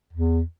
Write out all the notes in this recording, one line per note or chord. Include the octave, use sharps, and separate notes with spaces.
E2